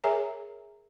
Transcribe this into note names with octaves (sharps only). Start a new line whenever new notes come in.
G#4 A#4 C#5 E5 G#5 A#5